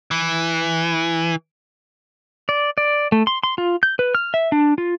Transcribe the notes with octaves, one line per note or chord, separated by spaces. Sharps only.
E3
D5
D5
A3
C6
C6
F4
G6
B4
F6
E5
D4
F4